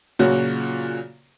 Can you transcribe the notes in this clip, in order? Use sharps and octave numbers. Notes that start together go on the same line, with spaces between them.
A#2 C#3 F#3 C#4 F#4